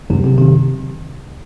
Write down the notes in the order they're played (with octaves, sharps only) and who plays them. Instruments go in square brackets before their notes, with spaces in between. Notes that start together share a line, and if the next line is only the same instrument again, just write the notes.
[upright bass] F#2 [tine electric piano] C3
[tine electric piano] C3
C3 D#3